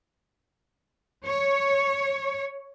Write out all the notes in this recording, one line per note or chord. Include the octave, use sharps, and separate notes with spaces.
C#5